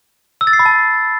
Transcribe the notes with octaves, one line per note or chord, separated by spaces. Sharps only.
E6
A6
C7
B5
A5